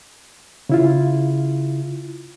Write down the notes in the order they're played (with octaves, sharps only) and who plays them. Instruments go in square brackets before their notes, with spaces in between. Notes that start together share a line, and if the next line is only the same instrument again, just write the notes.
[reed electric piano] C#3 E4 F4